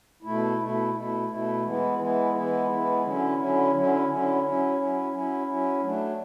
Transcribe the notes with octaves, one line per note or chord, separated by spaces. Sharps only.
B2 A3 E4
B2 A3 E4
B2 A3 E4
B2 A3 E4
E3 G#3 B3 E4
E3 G#3 B3 E4
E3 G#3 B3 E4
E3 G#3 B3 E4
D3 F#3 C#4 E4
D3 F#3 C#4 E4
D3 F#3 C#4 E4
D3 F#3 C#4 E4
F#3 C#4 E4
F#3 C#4 E4
F#3 C#4 E4
F#3 C#4 E4
F#3 A3 D4